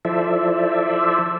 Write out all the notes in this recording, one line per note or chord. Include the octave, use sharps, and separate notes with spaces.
F3 E4 A4 C5 D5 E5